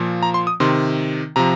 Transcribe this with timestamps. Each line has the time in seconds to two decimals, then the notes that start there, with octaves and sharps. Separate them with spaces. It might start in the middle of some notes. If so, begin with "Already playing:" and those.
Already playing: A#2 F3
0.23 A#5
0.34 C6
0.47 D#6
0.60 C3 D#3 C6
1.36 C3 F3 A#5